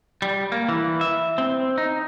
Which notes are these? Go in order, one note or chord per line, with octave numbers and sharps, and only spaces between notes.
G3
A#3
E3
E5
C4
D#4